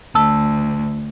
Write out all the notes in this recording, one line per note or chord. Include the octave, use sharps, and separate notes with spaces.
D2 A5 E6